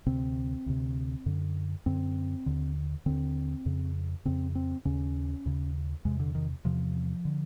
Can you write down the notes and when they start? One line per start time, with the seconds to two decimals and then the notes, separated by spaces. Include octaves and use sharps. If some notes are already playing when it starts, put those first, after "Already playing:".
0.06 D2 C3 C4
0.66 D2 C3
1.26 F#2 D3
1.86 F#2 D3 C4
2.46 D#2 D3
3.06 D#2 D3 C4
3.66 F2 C#3
4.25 F2 C#3 C4
4.55 C4
4.85 D#2 C#3 C#4
5.46 D#2 C#3
6.05 E2 C3 G#3
6.20 D3
6.35 D#3
6.65 E2 C3 F3
7.25 D3